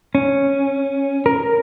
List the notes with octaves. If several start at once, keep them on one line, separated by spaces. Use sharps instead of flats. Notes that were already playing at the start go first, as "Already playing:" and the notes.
C#4
A#4